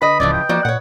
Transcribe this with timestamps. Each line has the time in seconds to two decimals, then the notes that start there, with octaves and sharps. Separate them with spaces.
0.02 D3 B4 D#5 B5
0.20 D1 C#3 E3 F3 D5
0.33 G5
0.49 F3 A#3 F#4 D5
0.65 A#2 C#5 F#5